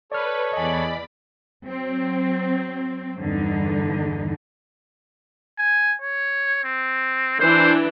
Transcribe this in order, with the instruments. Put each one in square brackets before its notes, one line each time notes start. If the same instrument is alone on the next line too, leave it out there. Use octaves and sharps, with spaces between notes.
[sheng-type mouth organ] A4 C#5 [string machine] B4 [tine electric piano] D5 F6
[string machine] E2 D5 B5 [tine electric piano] D#5 G#5
[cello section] F#3 C4
E2 G2 D3 D#4
[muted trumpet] G#5
C#5
C4
[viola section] E3 D4 [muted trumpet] C5